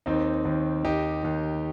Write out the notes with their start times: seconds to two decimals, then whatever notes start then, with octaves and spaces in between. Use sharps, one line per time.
0.06 D#2 D#3 C4 D#4
0.45 D#2 D#3
0.84 D#2 D#3 D#4 G4
1.23 D#2 D#3